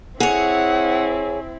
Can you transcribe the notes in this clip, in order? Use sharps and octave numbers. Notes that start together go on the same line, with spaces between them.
C4 E4 G#4 C#5 F#5